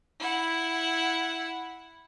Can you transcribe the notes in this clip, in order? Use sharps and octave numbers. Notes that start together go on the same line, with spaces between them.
E4 F#5